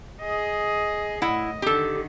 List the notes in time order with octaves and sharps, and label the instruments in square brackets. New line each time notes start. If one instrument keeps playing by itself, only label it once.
[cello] G#4 D#5
[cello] A2 D#5 [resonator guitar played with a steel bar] E4 F#5
[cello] D3 D#3 [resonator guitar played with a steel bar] G4 A4